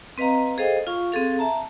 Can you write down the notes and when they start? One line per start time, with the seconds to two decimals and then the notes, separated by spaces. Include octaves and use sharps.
0.18 C4 B4 D#5 F5 A#5
0.58 G#4 A4 C5 D#5 F5 G5
0.87 F4 F5 C#6
1.12 C4 G#4 A4 F5
1.39 E5 A5 A#5